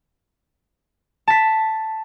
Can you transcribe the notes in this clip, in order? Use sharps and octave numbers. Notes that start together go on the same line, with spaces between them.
A5 B6